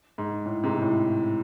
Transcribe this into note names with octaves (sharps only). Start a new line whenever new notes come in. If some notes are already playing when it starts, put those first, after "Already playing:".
G#2
A2
G#2 C3
A2